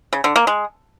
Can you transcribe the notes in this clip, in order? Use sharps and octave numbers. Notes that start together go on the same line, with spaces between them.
C#3
D3
A#3
G#3